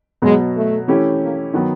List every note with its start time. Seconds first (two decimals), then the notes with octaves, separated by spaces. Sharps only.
0.22 B2 F#3 G#3 B3
0.56 A3
0.88 E3 A3 C#4 E4 G4
1.21 A#3
1.54 D#3 F#3 B3